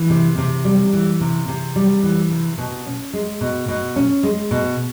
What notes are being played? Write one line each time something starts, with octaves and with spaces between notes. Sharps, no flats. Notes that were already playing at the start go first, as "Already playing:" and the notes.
Already playing: E3
C3
C3
G3
E3
C3
C3
G3
E3
C3
B2
C#4
G#3
B2
B2
C#4
G#3
B2